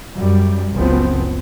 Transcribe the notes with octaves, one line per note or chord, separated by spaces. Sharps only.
F#2 G3
F#1 C#2 F3 B3 C4